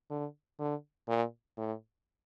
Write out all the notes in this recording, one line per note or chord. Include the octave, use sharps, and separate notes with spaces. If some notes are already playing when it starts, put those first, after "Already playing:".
D3
D3
A#2
A2